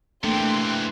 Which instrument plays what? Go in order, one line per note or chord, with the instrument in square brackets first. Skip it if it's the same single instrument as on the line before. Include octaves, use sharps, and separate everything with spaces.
[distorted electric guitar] C3 E3 [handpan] A3 A#3 D4 [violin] G5 C6